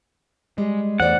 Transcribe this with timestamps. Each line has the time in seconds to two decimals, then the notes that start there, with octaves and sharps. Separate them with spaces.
0.58 G3 G#3
1.00 E2 A3 C5 D5 F#5